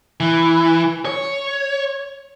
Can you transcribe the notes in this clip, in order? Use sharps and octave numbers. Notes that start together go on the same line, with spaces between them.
E3
C#5